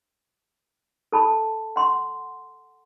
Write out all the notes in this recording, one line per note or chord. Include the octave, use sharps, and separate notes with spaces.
A4 A5 B5
F#5 C6